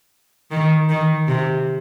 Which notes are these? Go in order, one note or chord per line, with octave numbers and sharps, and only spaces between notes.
D#3
D#3
C3